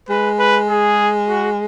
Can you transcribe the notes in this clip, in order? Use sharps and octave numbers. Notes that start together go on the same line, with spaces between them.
G#3 B4
B4
G#4
F#4